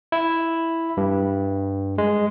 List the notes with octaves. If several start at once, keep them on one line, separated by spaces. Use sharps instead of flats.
E4
G2
G#3